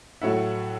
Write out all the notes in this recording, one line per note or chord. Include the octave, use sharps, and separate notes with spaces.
A2 F#3 A3 E5 F#5